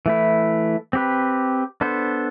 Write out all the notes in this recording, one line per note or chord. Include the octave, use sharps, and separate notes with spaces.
E3 A3 E4
C4 G4 B4
B3 D4 A4 C5